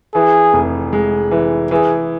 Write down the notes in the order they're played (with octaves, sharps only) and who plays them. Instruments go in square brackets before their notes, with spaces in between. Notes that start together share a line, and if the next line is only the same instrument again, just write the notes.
[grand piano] E3 [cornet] G#4
[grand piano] F1
G#3
E3
[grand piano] E3 [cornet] G#4